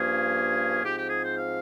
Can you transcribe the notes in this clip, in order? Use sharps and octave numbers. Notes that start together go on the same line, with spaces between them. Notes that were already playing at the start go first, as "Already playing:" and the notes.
Already playing: G2 F3 A#3 C#4 G#4
G#2 F3 C4 G4
G4
G#4
C5
F5